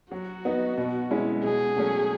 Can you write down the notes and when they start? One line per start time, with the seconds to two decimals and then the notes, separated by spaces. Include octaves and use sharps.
0.11 F#3 F#4
0.45 B3 D#4
0.78 B2
1.11 G#3 C#4 E4
1.43 B2 G#4
1.76 F#3 A3 C#4